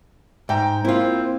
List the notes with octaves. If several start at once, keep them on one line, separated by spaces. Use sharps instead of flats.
G#2 E5 G5 A#5
A#3 C4 E4 F4